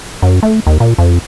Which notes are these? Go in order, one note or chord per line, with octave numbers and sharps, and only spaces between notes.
F#2
A3
D#2
A#2
F2